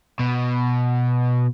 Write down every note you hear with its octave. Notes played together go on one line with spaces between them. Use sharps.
B2